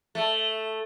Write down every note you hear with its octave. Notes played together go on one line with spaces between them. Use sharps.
A3